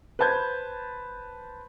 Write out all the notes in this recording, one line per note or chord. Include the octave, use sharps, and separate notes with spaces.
B4 C5 A5 G6 G#6